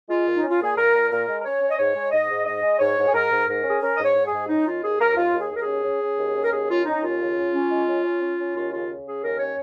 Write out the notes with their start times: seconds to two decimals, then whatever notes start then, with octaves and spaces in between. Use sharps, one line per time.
0.08 G#3 F4
0.26 A#2
0.35 D#4
0.42 C#4
0.49 F4
0.59 A#2 G#4
0.76 A#2 A#4
0.93 A#2
1.10 A#2 A#4
1.27 G#3
1.40 A#4
1.44 C#4 C#5
1.61 C#4
1.69 D#5
1.78 G#2 C#5
1.94 G#3
2.11 G#2 D#5
2.29 G#2
2.46 G#2 D#5
2.62 G#3
2.79 G#2 C#5
2.97 G#2
3.06 G#4
3.13 G#2 A#4
3.30 G#2
3.47 G#2 A#4
3.64 C#4
3.69 G#4
3.80 C#4 A#4
3.96 G#2 D#5
4.04 C#5
4.15 G#2
4.26 G#4
4.32 G#2
4.48 C#4 D#4
4.65 D#3 F4
4.82 D#2 G#4
4.99 D#2 A#4
5.16 D#2 F4
5.33 D#2
5.39 G#4
5.50 D#2
5.56 A#4
5.61 G#4
5.67 C#4
5.83 C#4
6.01 C#4
6.19 D#2
6.35 C#4
6.44 A#4
6.51 D#2 G#4
6.69 C#4 F4
6.85 C#4 D#4
7.02 D#2 F4
7.20 C#3
7.37 C#4
7.53 C#4
7.70 G#3
7.88 C#4
8.04 C#4
8.21 C#4
8.38 C#4
8.55 D#2 F4
8.72 C#3 F4
8.89 C#3
9.06 C#4 G#4
9.23 D#2 A#4
9.39 C#4 C#5